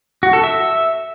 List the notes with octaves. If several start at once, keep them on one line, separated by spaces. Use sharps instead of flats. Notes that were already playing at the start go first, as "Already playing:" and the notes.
F#4
A4
E5